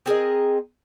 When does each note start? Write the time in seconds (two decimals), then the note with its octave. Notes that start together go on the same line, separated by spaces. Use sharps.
0.06 C4 G#4 A#4 D#5